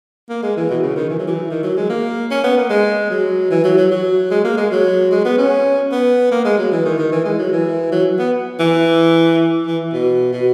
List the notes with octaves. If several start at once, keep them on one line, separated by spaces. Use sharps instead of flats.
A#3
G#3
E3
B2
C#3
D#3
E3
F#3
E3
D#3
F#3
G#3
A#3
C#4
B3
A#3
G#3
F#3
E3
F#3
F#3
F#3
G#3
A#3
G#3
F#3
G#3
B3
C#4
B3
A#3
G#3
F#3
E3
D#3
D#3
E3
G#3
F#3
E3
F#3
B3
E3
E3
B2
B2